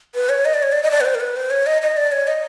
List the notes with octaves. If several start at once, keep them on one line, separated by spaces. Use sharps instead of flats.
B4
C#5
D#5
D5
C#5
D5
D#5
D5
B4
C5
A#4
B4
C5
C#5
D#5
D#5
D5
C#5
D#5